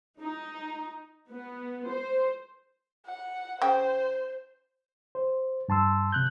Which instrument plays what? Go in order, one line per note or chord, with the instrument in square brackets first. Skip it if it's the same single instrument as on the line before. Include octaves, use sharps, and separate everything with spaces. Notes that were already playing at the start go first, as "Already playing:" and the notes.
[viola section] D#4
B3
C5
[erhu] F#5
[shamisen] C#3 G5 [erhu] C5
[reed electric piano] C5
G2 A5 C6 E6
C3 F#6 G6